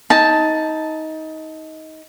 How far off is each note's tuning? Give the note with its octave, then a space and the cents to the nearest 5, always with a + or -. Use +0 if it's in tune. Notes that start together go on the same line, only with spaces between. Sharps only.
D#4 +20 A5 +0